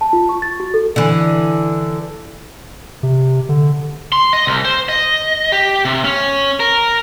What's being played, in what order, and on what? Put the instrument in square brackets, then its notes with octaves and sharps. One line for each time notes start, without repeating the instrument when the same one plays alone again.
[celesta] A5
F4
C#6
A6
F#4
A4
[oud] D3 E3
[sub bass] C3
D3
[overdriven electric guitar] C6
D#5
C2
C5
D#5
G4
C3
C#4
A#4